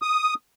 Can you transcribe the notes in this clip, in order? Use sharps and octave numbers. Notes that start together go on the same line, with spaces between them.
D#6